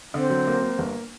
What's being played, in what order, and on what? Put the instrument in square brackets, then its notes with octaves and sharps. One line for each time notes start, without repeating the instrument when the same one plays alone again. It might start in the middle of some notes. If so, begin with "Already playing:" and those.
[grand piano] D3 [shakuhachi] C4
[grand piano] F#3
A#3
A#3
G1